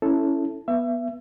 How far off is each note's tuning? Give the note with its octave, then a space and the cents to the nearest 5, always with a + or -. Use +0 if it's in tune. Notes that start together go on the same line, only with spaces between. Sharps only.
C#4 +0 E4 +0 A4 +0
B3 -15 E5 +35